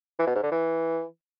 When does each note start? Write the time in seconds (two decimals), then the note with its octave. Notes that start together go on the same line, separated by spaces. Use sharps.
0.19 E3
0.27 B2
0.35 G#2
0.43 D3
0.51 E3